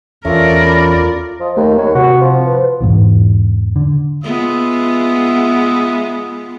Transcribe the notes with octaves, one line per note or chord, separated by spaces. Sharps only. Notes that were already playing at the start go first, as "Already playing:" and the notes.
E2 A3 C#4 F4 A#4 D5
B5
F3 D#5
D#2 A3
D#2 C#5
C3 F#4
F3
B4
E2 G#2 B2 E3
D3
G#3 B3 F4 E5 D#6